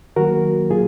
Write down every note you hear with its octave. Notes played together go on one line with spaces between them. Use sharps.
D#3 F#3 A#3 F#4 A#4
A#2 F#3 A#3 F4 G#4